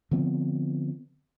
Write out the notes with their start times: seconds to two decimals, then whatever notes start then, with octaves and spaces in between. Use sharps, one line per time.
0.11 D3 F3 B3 C4